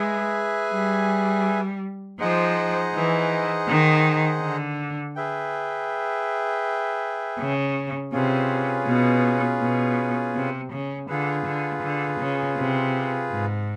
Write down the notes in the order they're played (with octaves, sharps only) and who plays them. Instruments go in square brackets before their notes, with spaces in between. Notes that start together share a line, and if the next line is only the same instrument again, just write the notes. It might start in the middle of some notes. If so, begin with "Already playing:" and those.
Already playing: [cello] G#3 [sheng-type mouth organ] G#4 B4 E5 G#5
[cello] G3
[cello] F3 [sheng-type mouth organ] D#4 G#4 C5 D#5 F#5
[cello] E3
D#3
D3
[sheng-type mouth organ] G#4 B4 E5 G5
[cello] C#3
[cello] C3 [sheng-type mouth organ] C#4 F4 G#4 B4
[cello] B2
B2
C3
C#3
[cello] D3 [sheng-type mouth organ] F4 G#4 B4
[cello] D3
D3
C#3
C3
G#2